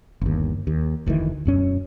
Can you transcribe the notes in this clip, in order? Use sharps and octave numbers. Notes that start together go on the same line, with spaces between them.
G1 D#2
D#2
F1 D2 D#3 E3
E1 F#2 C#4